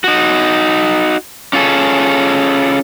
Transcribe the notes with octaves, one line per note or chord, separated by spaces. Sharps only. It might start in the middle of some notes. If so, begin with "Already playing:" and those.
D#4 F#4
C#4 F4 G#4 A4